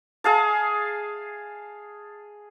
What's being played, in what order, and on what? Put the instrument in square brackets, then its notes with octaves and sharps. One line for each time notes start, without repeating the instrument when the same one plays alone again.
[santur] G#4 F5 A5